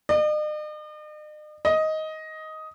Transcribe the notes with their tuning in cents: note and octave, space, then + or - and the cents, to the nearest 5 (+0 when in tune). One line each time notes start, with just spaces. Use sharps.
D#5 -45
D#5 +10